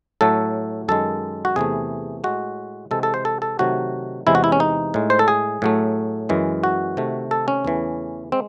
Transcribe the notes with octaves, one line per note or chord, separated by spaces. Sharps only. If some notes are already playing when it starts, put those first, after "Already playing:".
A2 F#3 A3 A4
F#2 D#3 G#3 A4
F#4
E2 C3 E3 A3 G#4
A2 G#3 F#4
C3 E3 G#3 A4
A4
C5
A4
A4
C3 D#3 F#3 A3 F#4
E2 C3 E3 G#3 E4
F#4
E4
C#4
D#4
A2 G#3
C5
A4
G#4
A2 F#3 A3
F#2 E3 G#3
F#4
C3 D#3 A3
A4
C#4
E2 C#3 E3 A3
G#3 C4